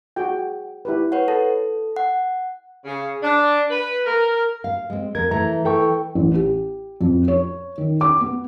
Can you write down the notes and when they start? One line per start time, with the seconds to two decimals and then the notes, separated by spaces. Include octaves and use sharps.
0.16 F#4 G#4 G5
0.85 E4 G4 B4
1.12 B4 C#5 F#5
1.28 A4 A5
1.96 F#5
2.85 C#3
3.23 D4
3.70 B4
4.05 A#4
4.64 F5
4.90 G#3 C4
5.15 F2 A#4 G#6
5.31 E3 A3 A#5
5.65 E3 A4 G5 C#6
6.15 A1
6.34 G4
7.01 F2
7.28 C#5
7.78 D#3
8.01 D6
8.20 B3